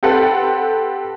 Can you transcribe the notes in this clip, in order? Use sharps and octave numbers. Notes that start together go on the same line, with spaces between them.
C4 G4 A4 B4 F#5